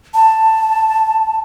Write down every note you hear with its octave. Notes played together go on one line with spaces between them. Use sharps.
A5